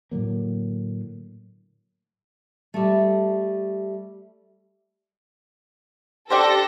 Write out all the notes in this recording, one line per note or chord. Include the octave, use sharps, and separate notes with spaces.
A2 D3 F#3 A#3
G3 A3
D4 G4 A4 C5 A#6